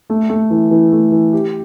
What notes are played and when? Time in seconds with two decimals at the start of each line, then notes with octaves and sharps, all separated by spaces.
0.10 A3
0.29 A3
0.50 E3
0.71 E3
0.92 A3
1.12 E3
1.33 G4